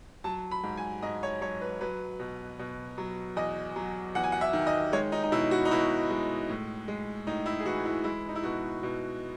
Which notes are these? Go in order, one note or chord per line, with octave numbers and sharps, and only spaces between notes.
F#3 A5
B5
G#2
G#5
G#2 D#5
C#5
F#3 C#5
B4
F#3 B4
B2
B2
F#3
E2 D#5
F#3
E2 F#5
G#5
F#5
E5
D#3
D#5
G#3 C#5
D#4
D#4
B2 E4
F#4
D#4
B2 E4
G#3
A2
G#3
A2 D#4
E4
G#4
E3 F#4
E4
G#3 E4
D#4
E4
B2 F#4
B2